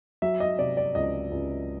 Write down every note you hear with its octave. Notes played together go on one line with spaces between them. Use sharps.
F#3 E5
D#5
C3 D5
D5
C#2 D#5
C#2